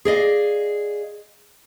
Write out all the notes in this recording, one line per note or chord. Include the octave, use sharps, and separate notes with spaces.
G#4 D5 D#5 F5